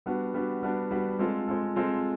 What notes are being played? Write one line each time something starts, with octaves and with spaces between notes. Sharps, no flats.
G3 B3 D4 F#4
G3 B3 D4 F#4
G3 B3 D4 F#4
G3 B3 D4 F#4
G#3 C4 F4 A4
G#3 C4 F4 A4
G#3 C4 F4 A4